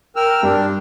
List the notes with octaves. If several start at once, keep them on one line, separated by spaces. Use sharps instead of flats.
A#4 G5 E6 F6
G2 D4